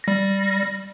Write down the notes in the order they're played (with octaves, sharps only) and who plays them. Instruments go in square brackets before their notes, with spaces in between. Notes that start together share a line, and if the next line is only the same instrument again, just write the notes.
[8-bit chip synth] G3 A#6